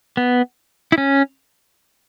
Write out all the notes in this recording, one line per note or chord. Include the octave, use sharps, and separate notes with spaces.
B3
E4
C#4